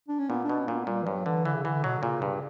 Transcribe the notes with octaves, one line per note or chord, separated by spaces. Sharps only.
D4
C#4
A#2 B3
D4
B2
C#4
A#2 A#3
B3
A#2 G3
E3
G2 F#3
D3 E3
D3 E3
C#3
D3 E3
B2 F#3
D3
A#2 C#3
G2